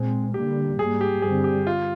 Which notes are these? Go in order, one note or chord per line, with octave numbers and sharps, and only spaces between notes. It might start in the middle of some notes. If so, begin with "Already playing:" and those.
Already playing: A#2 G#3 C4
D3 G3 A#3 G4
G#2 G3 A#3 G#4
G4
G2 D3 G3 C4 G#4
G4
F4